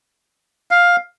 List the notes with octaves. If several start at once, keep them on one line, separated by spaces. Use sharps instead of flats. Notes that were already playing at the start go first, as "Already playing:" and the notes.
F5